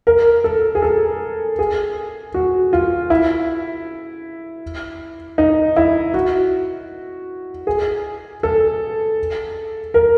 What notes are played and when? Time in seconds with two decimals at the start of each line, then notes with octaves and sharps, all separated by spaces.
0.07 A#4
0.44 A4
0.75 G#4
0.82 A4
1.59 G#4
2.34 F#4
2.73 F4
3.10 E4
5.38 D#4
5.76 E4
6.14 F#4
7.67 G#4
8.43 A4
9.94 A#4